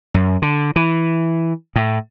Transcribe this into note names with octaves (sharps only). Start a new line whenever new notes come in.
F#2
D3
E3
A2